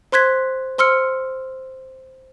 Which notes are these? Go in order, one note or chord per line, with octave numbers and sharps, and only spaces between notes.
C5 C6 F#6 G#6 B6
C5 C6 E6 F6 C#7